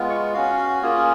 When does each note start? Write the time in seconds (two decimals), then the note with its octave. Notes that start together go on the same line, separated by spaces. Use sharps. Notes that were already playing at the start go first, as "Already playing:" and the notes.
Already playing: G#3 B3 F4
0.09 C#6
0.33 C#4 F#4 F5
0.82 A#3 C#4 F4 G#4